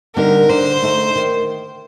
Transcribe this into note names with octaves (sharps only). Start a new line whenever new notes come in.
D3 G3 C4 D#4 A#4
D3 C5
A3 D#4 A4
D#3